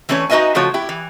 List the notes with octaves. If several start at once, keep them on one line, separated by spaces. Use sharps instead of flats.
E3 A3 C#4 B4 C#5
D#4 F#4 B4 D#5 E5 G#5
C#3 F3 A3 F#4 C#5
E4 G4
E3